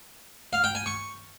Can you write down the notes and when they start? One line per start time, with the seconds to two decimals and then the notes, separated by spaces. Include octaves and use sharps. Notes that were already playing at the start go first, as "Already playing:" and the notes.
0.53 F5
0.64 G5
0.75 G#5
0.86 C#6